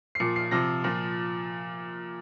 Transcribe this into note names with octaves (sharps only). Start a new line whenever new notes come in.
C7
A#2 F3 C#7
C7
C3 F3 A#6
A#2 F3